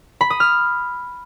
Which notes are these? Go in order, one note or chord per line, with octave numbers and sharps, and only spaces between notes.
B5
D#6
F6